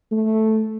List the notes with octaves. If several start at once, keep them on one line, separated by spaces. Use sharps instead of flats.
A3